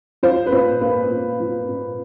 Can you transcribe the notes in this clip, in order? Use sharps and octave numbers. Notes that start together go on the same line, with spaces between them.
F3 C5
B4
A#2 C5
A#3 B4
A#2
F3
A#2